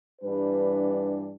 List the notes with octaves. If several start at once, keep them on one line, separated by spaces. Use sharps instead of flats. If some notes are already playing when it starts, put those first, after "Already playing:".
G2 E3 G3 D4 B4